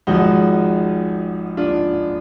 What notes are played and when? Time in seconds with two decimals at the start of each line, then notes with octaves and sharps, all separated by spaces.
0.07 G#1 G#2 F3 D#4 F#4
1.57 D4 F4